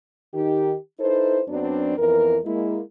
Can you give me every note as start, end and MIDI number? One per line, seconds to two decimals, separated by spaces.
0.34 0.75 51
0.34 0.75 63
0.34 0.75 67
0.99 1.41 63
0.99 1.41 64
0.99 1.41 69
0.99 1.41 71
0.99 1.41 72
1.48 1.95 42
1.48 1.95 54
1.48 1.95 59
1.48 1.95 60
1.48 1.95 62
1.98 2.38 41
1.98 2.38 52
1.98 2.38 59
1.98 2.38 70
2.45 2.81 56
2.45 2.81 58
2.45 2.81 64